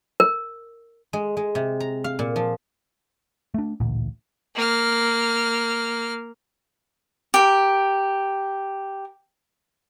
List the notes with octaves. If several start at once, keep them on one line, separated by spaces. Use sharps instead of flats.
A#4
G#3
G#3
C3
A#5
F5
A#2
F3
A3 D4
A1 D2 A#2
A#3 F6
G4 A#4